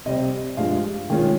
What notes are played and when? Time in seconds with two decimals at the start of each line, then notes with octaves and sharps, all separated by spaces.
0.06 C3 G3 C4 D#5
0.57 G2 F3 G#3 F5
1.10 D#3 G#3 C#4 F4 G5